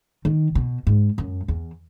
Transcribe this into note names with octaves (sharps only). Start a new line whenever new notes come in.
D#3
B2
G#2
F#2
E2